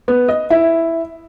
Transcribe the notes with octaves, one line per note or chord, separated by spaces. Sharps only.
B3
D#5
E4